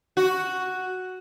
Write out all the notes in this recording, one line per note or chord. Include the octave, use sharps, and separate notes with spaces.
F#4